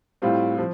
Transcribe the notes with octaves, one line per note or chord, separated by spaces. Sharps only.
A2 G3 C4 F4
F3